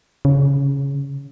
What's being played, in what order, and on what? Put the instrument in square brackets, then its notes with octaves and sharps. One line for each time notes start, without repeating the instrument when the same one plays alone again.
[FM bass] C#3